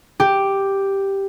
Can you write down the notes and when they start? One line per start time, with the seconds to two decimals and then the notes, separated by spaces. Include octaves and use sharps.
0.20 G4